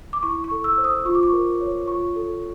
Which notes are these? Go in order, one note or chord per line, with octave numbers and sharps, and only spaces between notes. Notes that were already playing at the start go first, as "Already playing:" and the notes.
D6
E4 C#6
C#6
A4
E6
C5
D#6
F4 C#6
D6
C#6
A#4
C#5
F4 C#6
A4